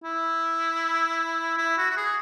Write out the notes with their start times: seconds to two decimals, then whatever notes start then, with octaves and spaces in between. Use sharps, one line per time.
0.04 E4
1.58 E4
1.78 F#4
1.90 F#4
1.97 G#4